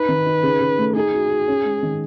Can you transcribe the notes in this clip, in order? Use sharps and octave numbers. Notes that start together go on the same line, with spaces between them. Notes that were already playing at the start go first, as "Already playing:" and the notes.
Already playing: D#4 B4
D#3
D#4
C#3
C#3
A3
D#4 G#4
F#4
F#4
C#4
G#3
D#3